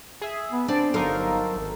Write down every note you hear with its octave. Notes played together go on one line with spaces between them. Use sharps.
G#4 E5
B3
C4 D4 D5
G1 F#3 D#4 A4 A#4 C5 F5
G#1